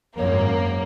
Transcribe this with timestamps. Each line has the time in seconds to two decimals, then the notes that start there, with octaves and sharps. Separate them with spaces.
0.18 G#1 F#2 A#3 C#5